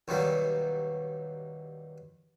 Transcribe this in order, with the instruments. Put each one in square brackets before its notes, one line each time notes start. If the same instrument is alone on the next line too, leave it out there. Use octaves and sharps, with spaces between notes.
[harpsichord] D#2 B2 D#3 F#3 G3